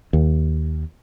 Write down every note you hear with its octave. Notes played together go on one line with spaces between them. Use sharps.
D#2